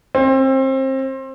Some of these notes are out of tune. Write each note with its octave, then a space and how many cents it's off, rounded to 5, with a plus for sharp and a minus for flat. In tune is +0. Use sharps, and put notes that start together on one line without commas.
C4 +30